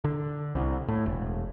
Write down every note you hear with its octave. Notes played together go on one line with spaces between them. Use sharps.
D3
C2
A2
E1